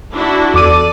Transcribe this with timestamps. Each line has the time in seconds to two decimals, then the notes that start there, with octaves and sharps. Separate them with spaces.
0.12 D4 E4 F#4
0.54 E2 A4 D5 D6 D#7